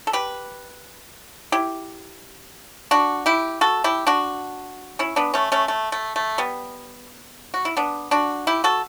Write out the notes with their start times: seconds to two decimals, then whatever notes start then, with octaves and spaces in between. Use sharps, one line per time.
0.07 A4
0.13 G4 B4
1.52 E4 G4
2.91 D4 F#4
3.26 E4 G4
3.61 F#4 A4
3.84 E4 G4
4.07 D4 F#4
4.99 C#4 E4
5.16 B3 D4
5.34 A3 C#4
5.52 A3 C#4
5.68 A3
5.92 A3
6.16 A3
6.38 G3 B3
7.54 F#4
7.65 E4
7.77 B3 D4
8.11 D4 F#4
8.47 E4 G4
8.64 F#4 A4